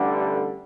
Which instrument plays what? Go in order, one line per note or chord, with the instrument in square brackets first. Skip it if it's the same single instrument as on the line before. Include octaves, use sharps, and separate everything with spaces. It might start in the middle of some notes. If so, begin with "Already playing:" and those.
Already playing: [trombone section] A1 G2 D3 G3